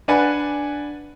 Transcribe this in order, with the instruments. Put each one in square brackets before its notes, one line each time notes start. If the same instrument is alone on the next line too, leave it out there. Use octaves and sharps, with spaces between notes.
[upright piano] D4 B4 D5 F#5 G#5 B5